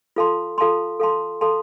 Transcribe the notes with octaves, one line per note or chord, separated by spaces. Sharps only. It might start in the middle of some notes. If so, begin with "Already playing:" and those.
F4 A4 F5 A5 C6
F4 A4 F5 A5 C6
A4 F5 A5 C6
A4 F5 A5 C6